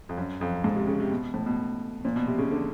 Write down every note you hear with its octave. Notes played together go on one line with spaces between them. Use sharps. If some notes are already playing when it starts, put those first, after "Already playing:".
F2
F#2
F2
G#2
C3
C#3
C3
B2
A2
B2
A#2
B2
C3
C#3
D3